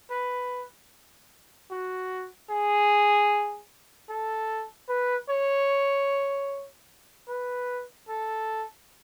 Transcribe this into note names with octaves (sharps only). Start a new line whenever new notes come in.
B4
F#4
G#4
A4
B4
C#5
B4
A4